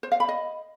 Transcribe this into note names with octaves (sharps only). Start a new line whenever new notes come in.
C5
F5
B5
D#5